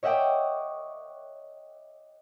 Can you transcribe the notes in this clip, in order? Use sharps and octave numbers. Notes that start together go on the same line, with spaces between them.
C#5 D#5 E5 F#5 G5 D6